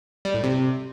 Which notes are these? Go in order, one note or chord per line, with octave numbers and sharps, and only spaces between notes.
G3
A2
C3